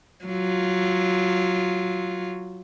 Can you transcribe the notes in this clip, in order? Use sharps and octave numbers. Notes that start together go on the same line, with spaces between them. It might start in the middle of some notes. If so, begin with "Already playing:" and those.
F#3 F4